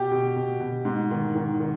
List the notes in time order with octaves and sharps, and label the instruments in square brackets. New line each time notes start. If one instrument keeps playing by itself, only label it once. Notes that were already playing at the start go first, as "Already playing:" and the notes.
Already playing: [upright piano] B2 G4 G5
B2
B2
B2
G#2
D#3
D#3
D#3